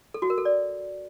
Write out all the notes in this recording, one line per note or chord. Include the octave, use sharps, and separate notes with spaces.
A4
F#4
A#4
A4
D5